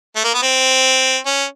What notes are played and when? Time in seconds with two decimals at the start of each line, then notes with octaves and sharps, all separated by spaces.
0.16 A3
0.24 A#3
0.34 B3
0.43 C4
1.26 C#4